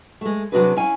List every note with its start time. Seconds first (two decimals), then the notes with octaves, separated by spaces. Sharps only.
0.21 G#3 A3
0.52 C3 F#3 D4 F#4 G#4 B4
0.77 C#4 E4 F5 G#5